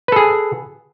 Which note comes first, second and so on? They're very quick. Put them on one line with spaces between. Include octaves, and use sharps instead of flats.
B4 A4 G#4